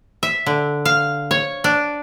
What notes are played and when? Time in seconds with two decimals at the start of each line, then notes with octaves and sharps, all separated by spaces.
0.23 E5
0.46 D3
0.85 F5
1.31 C#5
1.64 D4